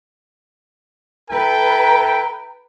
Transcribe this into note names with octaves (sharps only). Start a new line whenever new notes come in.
E4 A4 B4 G5 A#5